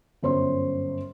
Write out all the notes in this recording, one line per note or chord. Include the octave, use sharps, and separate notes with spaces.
G1 F#2 C5 C#5 C6